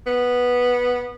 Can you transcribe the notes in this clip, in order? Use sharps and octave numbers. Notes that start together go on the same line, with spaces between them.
B3